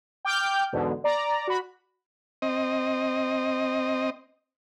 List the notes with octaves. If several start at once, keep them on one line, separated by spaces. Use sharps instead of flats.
G5 D6 F6 G6
E2 G#2 B2 D3
D5 A#5
F#4 B5
C4 D#5